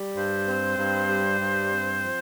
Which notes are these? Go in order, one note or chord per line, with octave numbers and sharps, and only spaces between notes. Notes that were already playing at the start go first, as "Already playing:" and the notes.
Already playing: G3
G2 C5
C4
G2
G3
G2
C4
F3